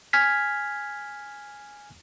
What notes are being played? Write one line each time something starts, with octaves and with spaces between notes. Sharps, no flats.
G#5 F6 G#6 B6